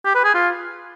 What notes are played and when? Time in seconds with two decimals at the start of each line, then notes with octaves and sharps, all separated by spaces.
0.05 G4
0.15 B4
0.24 G#4
0.34 F4